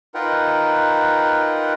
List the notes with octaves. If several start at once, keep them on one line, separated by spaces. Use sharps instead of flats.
D#4 F4 A#4 B4 F#5 G5